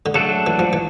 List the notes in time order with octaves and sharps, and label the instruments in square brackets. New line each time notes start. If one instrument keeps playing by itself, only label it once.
[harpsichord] D3
[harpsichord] C#3 [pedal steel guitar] F#3 A3 D4 F#4 A4
[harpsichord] E3
F3
E3